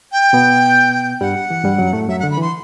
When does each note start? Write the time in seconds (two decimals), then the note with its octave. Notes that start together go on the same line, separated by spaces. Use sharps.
0.12 G5
0.33 B2 B3
1.21 G2 G3 F#5
1.50 E3
1.64 G2 G3
1.78 F#2 F#3
1.93 A2 A3
2.08 F#2 F#3 E5
2.19 D3 F#5
2.31 B5
2.38 E3 C6